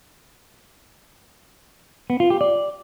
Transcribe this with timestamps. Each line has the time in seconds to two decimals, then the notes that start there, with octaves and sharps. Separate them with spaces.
2.10 B3
2.20 F4
2.30 G4
2.41 D5